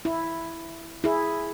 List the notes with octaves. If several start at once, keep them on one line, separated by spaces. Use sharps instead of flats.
E4
E4 G#4